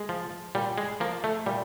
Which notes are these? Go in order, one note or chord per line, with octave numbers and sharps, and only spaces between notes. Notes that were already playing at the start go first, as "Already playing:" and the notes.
Already playing: G#3
F3
A#2 G3
G#3
F3 A#3
A3
A#2 G3